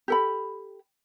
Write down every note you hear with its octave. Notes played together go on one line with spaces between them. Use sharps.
G4 A4 B5